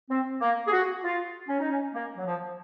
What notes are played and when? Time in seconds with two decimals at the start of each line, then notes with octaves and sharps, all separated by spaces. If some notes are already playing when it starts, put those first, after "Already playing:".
0.10 C4
0.41 A#3
0.67 G#4
0.72 F#4
1.03 F4
1.48 C#4
1.59 D#4
1.70 C#4
1.95 A#3
2.17 F#3
2.26 F3